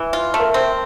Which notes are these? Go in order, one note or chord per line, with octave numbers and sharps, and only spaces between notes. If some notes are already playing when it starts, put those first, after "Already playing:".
Already playing: E3
F4
A3
A#4
C4